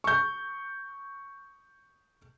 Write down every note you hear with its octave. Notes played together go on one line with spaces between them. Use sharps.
C#6 G6